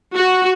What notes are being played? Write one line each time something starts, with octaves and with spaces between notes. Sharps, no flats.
F#4